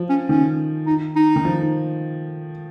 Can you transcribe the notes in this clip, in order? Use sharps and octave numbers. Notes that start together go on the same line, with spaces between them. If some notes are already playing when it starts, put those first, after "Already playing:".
Already playing: F3
C#4
D#3 C#4
D#4
D#4
D#3
F3